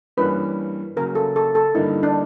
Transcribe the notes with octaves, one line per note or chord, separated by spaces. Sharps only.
G2 E3 G3 A#3 C#4 B4
C#3 F#3 A#3 A#4
A4
A4
A4
G2 D3 G3 A#3 D#4 E4
D4